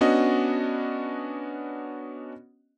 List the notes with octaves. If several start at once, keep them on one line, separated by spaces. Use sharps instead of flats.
B3 C#4 D4 F#4 D#5